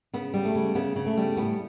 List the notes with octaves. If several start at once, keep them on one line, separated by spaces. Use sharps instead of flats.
C#3 B3
G3
A3
C#3
C#3 B3
C#3
A3
G3
A2 B3